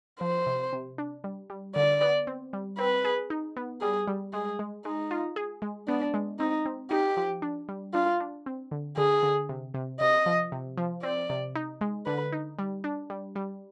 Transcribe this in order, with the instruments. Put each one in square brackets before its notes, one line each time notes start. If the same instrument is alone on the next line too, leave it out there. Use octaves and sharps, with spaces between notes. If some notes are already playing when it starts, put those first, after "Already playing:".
[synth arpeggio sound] F3 [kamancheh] C5
[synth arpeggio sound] C3
C3
D4
G3
G3
[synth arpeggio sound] D3 [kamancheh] D5
[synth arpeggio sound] B3
C4
G3
[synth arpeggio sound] C4 [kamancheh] B4
[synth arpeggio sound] G#4
D#4
B3
[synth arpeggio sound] G3 [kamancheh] G#4
[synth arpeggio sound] G3
[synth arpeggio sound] G#3 [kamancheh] G#4
[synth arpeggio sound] G#3
[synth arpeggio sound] G#3 [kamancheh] D#4
[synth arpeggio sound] F4
G#4
G#3
[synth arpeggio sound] B3 [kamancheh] D4
[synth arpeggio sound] G#3
[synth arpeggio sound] C4 [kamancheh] D#4
[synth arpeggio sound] C4
[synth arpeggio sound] D#4 [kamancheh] G4
[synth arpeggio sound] F3
D4
G3
[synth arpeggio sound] D4 [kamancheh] F4
[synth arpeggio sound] D4
C4
D3
[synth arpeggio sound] D3 [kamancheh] G#4
[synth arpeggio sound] D3
C3
C3
[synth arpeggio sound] C3 [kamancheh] D#5
[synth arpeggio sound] F3
C3
F3
[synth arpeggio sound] C4 [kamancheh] D5
[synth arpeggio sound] C3
D#4
G#3
[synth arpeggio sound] D3 [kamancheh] B4
[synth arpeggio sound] D#4
G3
D4
G3
G3